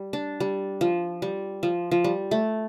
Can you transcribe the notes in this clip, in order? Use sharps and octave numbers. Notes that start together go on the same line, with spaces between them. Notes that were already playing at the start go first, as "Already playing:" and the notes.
Already playing: G3
D4
G3
F3
G3
F3
F3
G3
A3